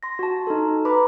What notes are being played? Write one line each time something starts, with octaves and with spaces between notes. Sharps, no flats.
C6 A#6
F#4 A5
D#4 A4
B4 A#5 B5 D6